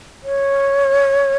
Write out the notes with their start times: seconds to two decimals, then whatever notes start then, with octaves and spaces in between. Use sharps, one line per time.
0.24 C#5